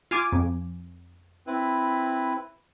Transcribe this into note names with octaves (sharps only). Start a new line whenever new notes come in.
F4 G#5 D6
F2
C4 E4 B4